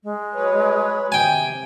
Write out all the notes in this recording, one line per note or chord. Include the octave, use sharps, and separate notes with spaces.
G#3
F#3 B4 C#5
C3 G5 G#5